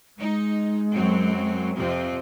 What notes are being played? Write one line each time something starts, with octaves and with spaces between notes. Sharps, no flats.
G#3 D#4
F#2 F#3 C4
F2 C3 C4